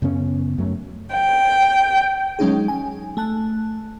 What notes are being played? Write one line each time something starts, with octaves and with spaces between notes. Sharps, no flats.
F#2 C#3 B3 C#4
F#2 F#3 A3
G5
F#3 G#3 C#4 D#4 G#4
G#5
A3 A5 F#6